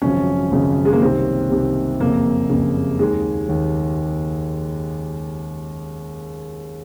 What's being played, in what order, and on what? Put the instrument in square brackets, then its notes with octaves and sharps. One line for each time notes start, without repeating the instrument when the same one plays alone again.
[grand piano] G#1 F#2 C#3 F3 C#4
G#1 F#2 C#3 F3
G#3
A#3
C2 C3 D#3 C4
C2 C3 D#3
F#1 F2 C#3 A#3
F#1 F2 C#3
D#2 D#3 G#3
D#2 D#3